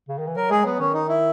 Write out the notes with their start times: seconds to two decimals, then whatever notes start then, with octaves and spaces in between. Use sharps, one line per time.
0.09 C#3
0.18 D#3
0.27 E3
0.36 F#3 A#4
0.50 G#3 G#4
0.65 F#3 B3
0.79 D#3 C#4
0.94 D#4
1.09 E4